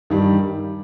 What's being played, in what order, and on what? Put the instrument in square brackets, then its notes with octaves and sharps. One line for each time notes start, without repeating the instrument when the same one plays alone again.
[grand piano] G2 D#3 G3